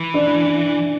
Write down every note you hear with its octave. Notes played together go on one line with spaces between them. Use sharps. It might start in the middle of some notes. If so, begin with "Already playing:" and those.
Already playing: E3
D4